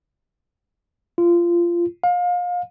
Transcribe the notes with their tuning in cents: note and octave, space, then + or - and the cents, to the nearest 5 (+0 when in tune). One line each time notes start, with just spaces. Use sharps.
F4 -20
F5 +30